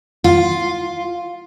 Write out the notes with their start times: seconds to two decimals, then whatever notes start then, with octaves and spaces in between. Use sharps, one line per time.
0.24 F4